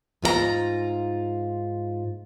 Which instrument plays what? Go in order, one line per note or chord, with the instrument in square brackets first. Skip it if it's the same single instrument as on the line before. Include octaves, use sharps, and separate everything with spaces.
[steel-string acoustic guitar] G#2 F4 A4 A#5